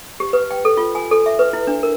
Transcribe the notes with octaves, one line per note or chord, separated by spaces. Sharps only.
G4
B4
G5
A4
F4
G#5
A4
E5
B4
E4
D4
A#4